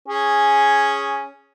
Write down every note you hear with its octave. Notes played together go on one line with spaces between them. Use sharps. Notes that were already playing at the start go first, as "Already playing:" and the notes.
C#4 G#4